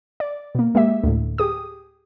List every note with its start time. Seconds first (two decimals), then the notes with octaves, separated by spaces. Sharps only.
0.20 D5
0.55 B2 A#3
0.75 G#3 A#3 G4 E5
1.03 D2 A2
1.38 G4 G#4 D#6